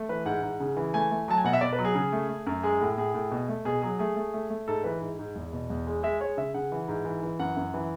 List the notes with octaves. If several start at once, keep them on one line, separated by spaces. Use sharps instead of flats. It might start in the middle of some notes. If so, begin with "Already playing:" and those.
Already playing: A3
E3 B4
G#2 F#5
G#2
C#3
E3
A3 G#5
A3
F#3 A5
G#5
B2 F#5
E5
B2 D5
B4
F#3
G#4
C#3
A3
A3
F#2
G#3 G#4
A2
A2 G#4
A2
B2
A3
B2 G#4
F#3 G#4
A3 G#4
A3
A3
A3
G#2 A4
E3 B4
G#2
G#2
E2
B2
E2
G#3
G#3 E5
G#3 C#5
C#3 E5
C#3 F#5
E3
G#2
E3
E3
F#2 F#5
F#2
E3